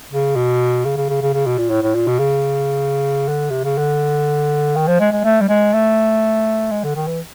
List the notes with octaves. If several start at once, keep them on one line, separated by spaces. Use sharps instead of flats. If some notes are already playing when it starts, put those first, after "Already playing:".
C#3
B2
C#3
C#3
C#3
C#3
C#3
B2
A#2
A2
A2
A#2
B2
C#3
D3
C3
C#3
D3
D#3
F3
G#3
G#3
A3
G3
G#3
A3
G#3
D3
D#3
E3